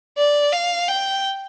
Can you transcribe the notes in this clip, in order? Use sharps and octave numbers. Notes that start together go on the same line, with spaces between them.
D5
F5
G5